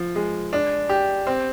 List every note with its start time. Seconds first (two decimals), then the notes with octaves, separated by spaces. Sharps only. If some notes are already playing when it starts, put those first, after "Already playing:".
Already playing: F3
0.16 G#3
0.53 D4
0.89 G4
1.27 C4